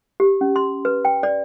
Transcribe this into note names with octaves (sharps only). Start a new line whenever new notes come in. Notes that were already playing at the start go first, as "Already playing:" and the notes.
G4
C#4
C6
B4
G5
D5